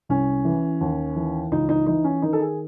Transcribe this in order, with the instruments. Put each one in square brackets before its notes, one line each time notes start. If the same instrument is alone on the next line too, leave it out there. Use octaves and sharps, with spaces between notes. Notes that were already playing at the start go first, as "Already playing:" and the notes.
[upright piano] C2 C#4
E3
D#2
E3
C#2 D#4
D#4
E3 D#4
C#4
D#3 D#4
A4
G#4